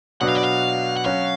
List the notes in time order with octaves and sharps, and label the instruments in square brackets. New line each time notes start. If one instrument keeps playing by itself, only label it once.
[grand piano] B2 F#3 B3 D4 F#4 [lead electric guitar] F#5
[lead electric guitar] F5
D5
F5
F#5
[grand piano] F#3 C#4 F#4 [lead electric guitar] F5